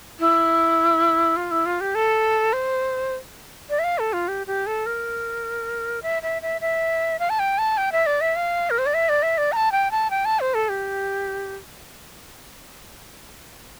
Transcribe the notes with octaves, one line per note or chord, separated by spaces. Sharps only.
E4
F4
E4
F4
G4
A4
C5
D5
E5
F5
A4
F4
G4
G4
A4
A#4
E5
E5
E5
E5
F5
A5
G5
A5
G5
E5
D5
E5
F5
A#4
C5
D5
E5
D5
E5
D5
A#5
A5
G5
A5
G5
A5
C5
A4
G4